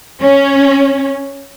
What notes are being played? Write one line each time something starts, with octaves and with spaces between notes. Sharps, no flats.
C#4